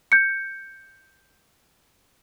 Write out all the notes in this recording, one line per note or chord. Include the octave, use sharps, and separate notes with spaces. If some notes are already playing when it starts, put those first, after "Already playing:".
G6 C#7